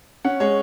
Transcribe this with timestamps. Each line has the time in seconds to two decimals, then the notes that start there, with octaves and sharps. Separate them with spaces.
0.24 C#4 F#5
0.40 G#3 C#5